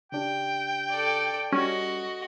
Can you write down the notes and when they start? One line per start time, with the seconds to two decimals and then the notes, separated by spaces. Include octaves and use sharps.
0.12 C#3 D4 G4 G5
0.90 A4 D5
1.52 G3 C#4 F#4 D#5